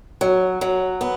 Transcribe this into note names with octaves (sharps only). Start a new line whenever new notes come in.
F#3
F#3
B3